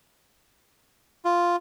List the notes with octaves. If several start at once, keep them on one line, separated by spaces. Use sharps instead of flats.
F4